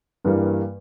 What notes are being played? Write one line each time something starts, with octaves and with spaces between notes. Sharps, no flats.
G2 E3 G3 A#3